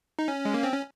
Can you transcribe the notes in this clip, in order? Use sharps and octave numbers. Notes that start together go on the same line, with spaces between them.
D#4
C#4
G#3
A#3
C4
C#4